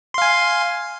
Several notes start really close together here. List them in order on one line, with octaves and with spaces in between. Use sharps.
C6 F5 G#5